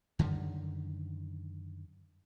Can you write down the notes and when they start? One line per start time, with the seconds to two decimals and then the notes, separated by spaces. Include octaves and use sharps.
0.19 F#2 D3 D#3 G3